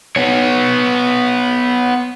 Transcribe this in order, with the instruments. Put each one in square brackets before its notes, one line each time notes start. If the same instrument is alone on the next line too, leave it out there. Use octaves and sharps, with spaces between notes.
[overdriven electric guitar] B3 C#5